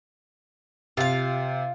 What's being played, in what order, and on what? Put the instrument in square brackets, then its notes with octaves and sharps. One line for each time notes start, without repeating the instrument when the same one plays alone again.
[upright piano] C3 [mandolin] F4 F5